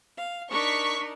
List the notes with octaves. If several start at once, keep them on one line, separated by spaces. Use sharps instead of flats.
F5
D4 D#4 A#4 C#6 B6